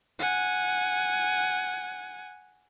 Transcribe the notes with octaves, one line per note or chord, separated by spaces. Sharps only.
F#5 G#5